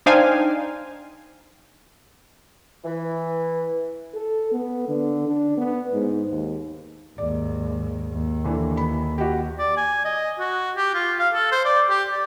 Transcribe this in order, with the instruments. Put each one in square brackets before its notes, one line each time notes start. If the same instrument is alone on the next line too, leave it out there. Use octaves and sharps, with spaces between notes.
[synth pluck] D4 D#4 C5 F5 G5 G#5
[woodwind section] E3
[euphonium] A4
B3
D3
D4
B3
G#2
D#2
[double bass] D#2 G#2 [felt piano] D5
[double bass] D#2
[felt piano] D3 E3
B5
F#4 G4
[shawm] D5
G#5
D#5
F#4
G4
F4
F5
A4
C5
D5
G4
D5